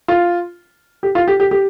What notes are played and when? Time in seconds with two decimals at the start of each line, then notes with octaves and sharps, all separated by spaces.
0.08 F4
1.03 G4
1.15 F4
1.28 G4
1.40 G4
1.51 G4